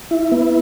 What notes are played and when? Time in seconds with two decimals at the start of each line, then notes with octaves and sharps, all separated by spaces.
0.11 E4
0.32 B3